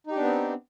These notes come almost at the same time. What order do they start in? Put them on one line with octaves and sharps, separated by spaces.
D#4 G4 D4 B3 C4